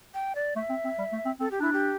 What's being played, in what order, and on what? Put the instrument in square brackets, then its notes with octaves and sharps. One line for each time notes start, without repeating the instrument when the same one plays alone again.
[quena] G5
D5
[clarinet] A3 [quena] E5
[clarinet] C4
C4
G3
A3
C4
[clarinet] C4 [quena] A4
[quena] G4
[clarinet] D4 [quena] E4
[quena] G4